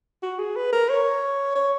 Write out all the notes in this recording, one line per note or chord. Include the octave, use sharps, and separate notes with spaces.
F#4
G#4
B4
A#4
C#5
C#5